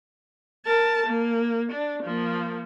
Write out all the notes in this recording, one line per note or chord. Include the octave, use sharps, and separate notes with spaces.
A#4 A5
A#3
D4
F3 A#3